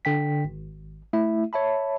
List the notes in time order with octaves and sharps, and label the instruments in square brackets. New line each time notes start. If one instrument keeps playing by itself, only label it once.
[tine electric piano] D3 G5 B6
G#1
A3 E4 E5
C#5 E5 A5 B5